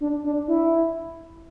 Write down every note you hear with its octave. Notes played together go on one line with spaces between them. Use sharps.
D4
D4
E4